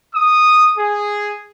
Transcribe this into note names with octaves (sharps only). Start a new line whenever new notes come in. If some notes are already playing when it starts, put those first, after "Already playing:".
D#6
G#4